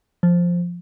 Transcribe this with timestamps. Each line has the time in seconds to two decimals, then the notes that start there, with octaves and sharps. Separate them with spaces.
0.23 F3